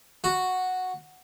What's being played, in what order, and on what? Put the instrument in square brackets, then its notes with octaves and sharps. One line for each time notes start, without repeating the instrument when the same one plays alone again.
[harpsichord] F#4